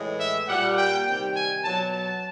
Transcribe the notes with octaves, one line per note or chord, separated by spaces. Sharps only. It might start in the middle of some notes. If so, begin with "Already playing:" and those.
Already playing: A2 E3 G#3
E5
A#2 G3 F#5
G5
C3 D#3 G3 G5
G#5
B2 F#3 A5
A5